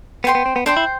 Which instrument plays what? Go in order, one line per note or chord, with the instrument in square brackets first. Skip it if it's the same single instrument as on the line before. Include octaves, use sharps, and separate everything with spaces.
[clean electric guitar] B3 [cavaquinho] C5 G5 C6
[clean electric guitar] B3
C4
B3
[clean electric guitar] D4 [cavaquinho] C5 G5 C6
[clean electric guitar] E4